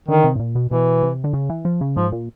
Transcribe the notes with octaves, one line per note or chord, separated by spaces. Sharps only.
D3 D#3
C3
A2
A#2
B2
B2 E3
C3
D3
C#3
E3
F3
C#3
G#2 F3
A#2